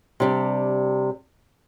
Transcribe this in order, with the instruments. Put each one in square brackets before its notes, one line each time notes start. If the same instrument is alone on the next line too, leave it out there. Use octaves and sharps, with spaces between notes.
[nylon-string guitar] C3 G3 D4